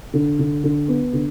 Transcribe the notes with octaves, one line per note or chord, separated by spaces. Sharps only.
D3
D3
D3
B3
D3